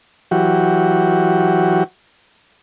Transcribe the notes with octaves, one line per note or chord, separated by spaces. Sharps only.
E3 F#3 F#4 G4